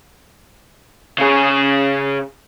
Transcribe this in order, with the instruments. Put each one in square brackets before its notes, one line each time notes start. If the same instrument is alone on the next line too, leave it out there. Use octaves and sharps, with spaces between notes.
[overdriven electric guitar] C#3 G#4